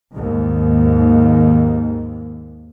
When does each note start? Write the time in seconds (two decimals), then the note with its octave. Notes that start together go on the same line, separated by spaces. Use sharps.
0.12 D#2 G#2